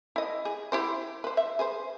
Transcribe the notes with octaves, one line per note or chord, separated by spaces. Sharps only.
E4 D#5
G#4
E4 G4 C5
B4 C5
E5
G#4 B4 C5